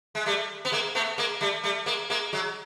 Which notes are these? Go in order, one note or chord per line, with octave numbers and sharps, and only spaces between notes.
G#3
G3 A3
B3
G#3 A#3
A3 B3
G#3 A#3
G3 A3
G3 A3
G#3 A#3
G#3 A#3
F#3 G#3